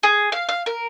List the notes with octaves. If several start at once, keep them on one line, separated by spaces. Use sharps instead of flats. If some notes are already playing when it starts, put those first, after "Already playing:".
G#4
F5
F5
A#4